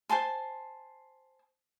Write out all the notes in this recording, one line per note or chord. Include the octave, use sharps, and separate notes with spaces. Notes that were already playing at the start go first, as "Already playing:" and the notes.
C5 G#5 A5 C6